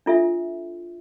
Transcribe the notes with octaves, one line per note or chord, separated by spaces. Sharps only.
D4 F4 A4 E5